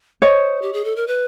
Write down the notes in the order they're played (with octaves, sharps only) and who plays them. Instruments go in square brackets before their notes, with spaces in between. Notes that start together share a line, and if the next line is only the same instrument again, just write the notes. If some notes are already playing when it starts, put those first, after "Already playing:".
[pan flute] C5 [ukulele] C#5 D#5
[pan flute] G4
G#4
A4
A#4
B4